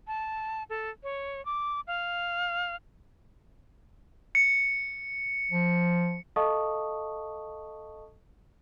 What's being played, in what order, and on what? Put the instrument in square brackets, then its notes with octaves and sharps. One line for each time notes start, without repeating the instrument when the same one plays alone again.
[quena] A5
A4
C#5
D6
F5
[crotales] C#7
[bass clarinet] F3
[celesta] A4 D#5 F5 A5 C#6 D#6